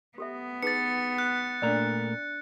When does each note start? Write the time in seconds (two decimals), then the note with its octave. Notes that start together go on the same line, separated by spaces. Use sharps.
0.18 B3 G4 A4 E5
0.63 D#4 G#4 B4 A6 C#7
1.18 F#6
1.62 A#2 A3 D4 A#4 D5